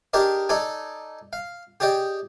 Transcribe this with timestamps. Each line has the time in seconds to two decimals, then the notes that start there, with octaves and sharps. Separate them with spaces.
0.14 D4 G4 G#4 A#4 D5 D#5
0.49 D#4 A4 D5 G#5
1.33 F5
1.80 G4 G#4 D5 D#5 G5